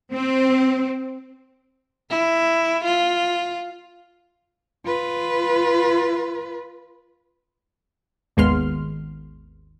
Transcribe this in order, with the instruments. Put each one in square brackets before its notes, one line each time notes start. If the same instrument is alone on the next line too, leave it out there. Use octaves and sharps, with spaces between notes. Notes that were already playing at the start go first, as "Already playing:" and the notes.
[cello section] C4
[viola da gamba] E4
F4
[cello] F4 B4
[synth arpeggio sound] G#1 D#2 G#3 B3 C6 F6